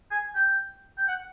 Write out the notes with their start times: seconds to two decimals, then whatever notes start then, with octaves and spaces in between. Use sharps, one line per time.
0.11 G#5
0.35 G5
0.98 G5
1.08 F#5